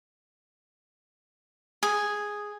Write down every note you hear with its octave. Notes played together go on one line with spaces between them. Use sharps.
G#4